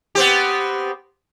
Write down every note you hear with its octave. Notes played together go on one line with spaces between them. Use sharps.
B3 C4 G4